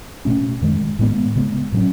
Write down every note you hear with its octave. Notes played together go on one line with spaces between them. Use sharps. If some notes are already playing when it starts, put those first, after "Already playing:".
B2 A3 C#4
F#2 D#3 G#3
A2 G#3 B3
C#3 G#3 B3
A2 F#3 C#4